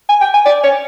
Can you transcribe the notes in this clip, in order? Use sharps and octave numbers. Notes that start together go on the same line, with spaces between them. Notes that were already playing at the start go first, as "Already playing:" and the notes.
G#5
G5
G#5
D5
C#5